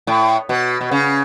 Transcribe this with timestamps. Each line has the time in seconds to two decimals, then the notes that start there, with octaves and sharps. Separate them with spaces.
0.07 A2
0.49 B2
0.81 B2
0.91 C#3